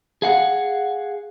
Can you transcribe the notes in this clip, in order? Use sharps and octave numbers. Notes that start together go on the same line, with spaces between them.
G#4 F5 F#5